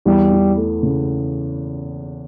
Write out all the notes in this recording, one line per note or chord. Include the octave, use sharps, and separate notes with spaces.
E2 G3
E3
A3
C#3